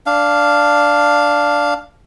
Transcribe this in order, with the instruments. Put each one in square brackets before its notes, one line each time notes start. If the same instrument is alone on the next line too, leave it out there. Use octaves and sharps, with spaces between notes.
[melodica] D4 F5